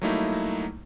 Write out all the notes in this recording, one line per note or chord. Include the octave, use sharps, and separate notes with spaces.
F#3 G3 A3 A#3 D#4 E4